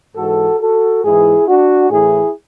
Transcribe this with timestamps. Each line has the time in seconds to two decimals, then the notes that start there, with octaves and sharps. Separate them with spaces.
0.16 G#2 E3 F#4 A4
0.60 F#4 A4
1.03 G#2 E3 E4 G#4
1.47 D4 F#4
1.90 A2 E3 E4 G#4